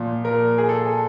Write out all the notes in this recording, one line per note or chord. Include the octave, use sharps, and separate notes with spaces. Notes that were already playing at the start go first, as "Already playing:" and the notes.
Already playing: A#2 F3
A#4
G#4
A4